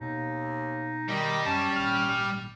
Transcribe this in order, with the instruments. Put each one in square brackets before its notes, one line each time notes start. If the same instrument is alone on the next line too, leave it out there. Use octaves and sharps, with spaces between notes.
[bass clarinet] D#2 [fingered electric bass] B2 [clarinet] D#4
[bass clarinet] D#3 [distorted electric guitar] G3 G4 [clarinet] D#5
[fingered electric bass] F#2 [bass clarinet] C#4 [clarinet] A5
[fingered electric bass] G#1 A#2 [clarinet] F6